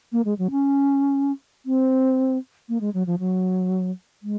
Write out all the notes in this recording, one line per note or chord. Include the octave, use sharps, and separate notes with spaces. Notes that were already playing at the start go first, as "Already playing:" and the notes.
A#3
G#3
F#3
C#4
C4
A#3
G#3
F#3
F3
F#3
G#3